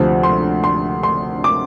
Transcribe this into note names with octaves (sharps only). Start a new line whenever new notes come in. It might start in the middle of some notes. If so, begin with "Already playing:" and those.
Already playing: D2 C3 F3 C4
C6
C6
C6
D6